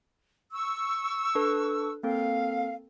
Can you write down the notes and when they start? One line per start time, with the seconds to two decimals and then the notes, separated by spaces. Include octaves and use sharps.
0.52 C#6 E6
1.35 D4 A4 B4
2.03 A#3 C4 A4 F5